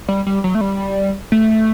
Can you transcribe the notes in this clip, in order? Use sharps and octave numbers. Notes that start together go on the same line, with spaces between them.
G3
G3
F#3
A3
G3
A3